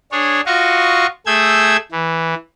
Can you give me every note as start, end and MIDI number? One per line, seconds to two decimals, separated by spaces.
0.12 0.41 62
0.12 0.41 68
0.12 0.41 73
0.46 1.06 65
0.46 1.06 66
0.46 1.06 75
0.46 1.06 77
0.46 1.06 85
1.26 1.77 57
1.26 1.77 68
1.26 1.77 88
1.26 1.77 91
1.26 1.77 92
1.92 2.35 52